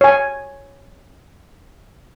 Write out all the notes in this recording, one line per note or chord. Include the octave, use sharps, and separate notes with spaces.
C#5 G#5